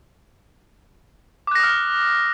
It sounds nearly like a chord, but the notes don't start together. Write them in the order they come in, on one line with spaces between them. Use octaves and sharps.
D6 F#6 A#6 D#6 F6